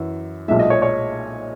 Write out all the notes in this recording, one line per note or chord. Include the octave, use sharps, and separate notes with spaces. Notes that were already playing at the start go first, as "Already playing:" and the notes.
Already playing: F#2 E3
B1 A#2 G#3 E5
D#5
C#5
C#5